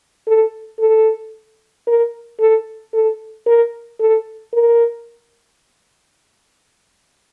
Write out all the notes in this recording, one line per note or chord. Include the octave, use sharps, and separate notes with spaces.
A4
A4
A#4
A4
A4
A#4
A4
A#4